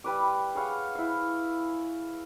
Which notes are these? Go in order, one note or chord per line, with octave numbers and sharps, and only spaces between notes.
G3 B4 D6
G#4 C#5 F5 F#5
E4 F5